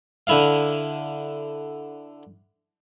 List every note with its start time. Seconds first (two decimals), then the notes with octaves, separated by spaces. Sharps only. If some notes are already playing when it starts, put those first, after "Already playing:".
0.27 D3 E4 F5